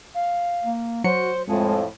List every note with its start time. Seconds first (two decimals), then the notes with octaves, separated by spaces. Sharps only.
0.15 F5
0.64 A#3
1.04 F#3 F#4 C5 C#7
1.48 F2 A2 F3 G#3 A5